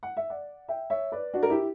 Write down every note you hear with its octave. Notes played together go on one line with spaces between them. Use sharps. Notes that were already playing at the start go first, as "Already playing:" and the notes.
F#5
E5
D5 F#5
E5 G5
C#5 E5
B4 D5
D4 F#4
A#4
E4 G4